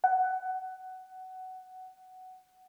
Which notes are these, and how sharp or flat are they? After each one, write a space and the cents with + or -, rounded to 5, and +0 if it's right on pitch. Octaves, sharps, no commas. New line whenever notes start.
F#5 +15